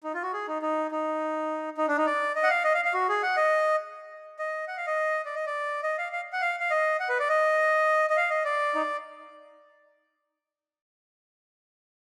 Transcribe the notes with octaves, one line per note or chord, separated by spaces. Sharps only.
D#4
F4
F#4
G#4
D#4
D#4
D#4
D#4
D4
D#4
D5
D#5
F#5
F5
D#5
F5
F5
F#4
G#4
F#5
D#5
D#5
F#5
F5
D#5
D5
D#5
D5
D#5
F5
F5
F#5
F5
F5
D#5
F#5
B4
D5
D#5
D#5
F5
D#5
D5
D#4